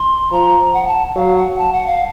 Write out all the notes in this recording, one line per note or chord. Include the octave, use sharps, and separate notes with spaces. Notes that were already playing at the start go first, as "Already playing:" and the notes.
Already playing: C6
F3 A#5
F#5
A5
F#3 F5
F#5
A5
F#5
F5